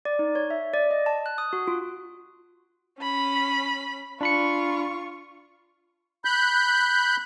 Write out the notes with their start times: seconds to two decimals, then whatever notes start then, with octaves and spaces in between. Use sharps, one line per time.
0.05 D5
0.19 D#4
0.35 C#5
0.50 E5
0.74 D5
0.91 D#5
1.06 A5
1.26 F#6
1.38 D#6
1.53 F#4
1.68 F4
3.00 C#4 B5
4.21 D4 F4 B5 C#6 C#7
6.25 B5 F#6 G6